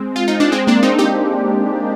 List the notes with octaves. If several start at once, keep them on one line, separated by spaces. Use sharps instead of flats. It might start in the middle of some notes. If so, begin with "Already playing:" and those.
Already playing: G#3 C4
F4
D#4
D4
G#3 C4
A#3 D4
C4 D#4
D#4 G4